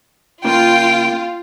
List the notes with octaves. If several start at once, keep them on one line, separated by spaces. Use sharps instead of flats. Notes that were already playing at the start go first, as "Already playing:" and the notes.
C#3 A#3 F4 G5